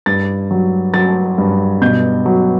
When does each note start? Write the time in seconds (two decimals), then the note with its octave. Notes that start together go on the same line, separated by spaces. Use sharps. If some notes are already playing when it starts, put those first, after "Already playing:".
0.06 G2 A6
0.51 F#3
0.94 F#3 A6
1.38 G2
1.82 B2 G6
2.26 F#3